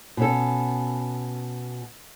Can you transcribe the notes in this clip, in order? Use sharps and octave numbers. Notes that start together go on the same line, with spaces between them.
B2 C#4 A4